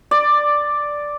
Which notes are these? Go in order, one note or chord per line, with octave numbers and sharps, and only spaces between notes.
D5